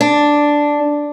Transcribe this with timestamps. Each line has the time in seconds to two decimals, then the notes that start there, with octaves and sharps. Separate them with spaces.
0.01 D4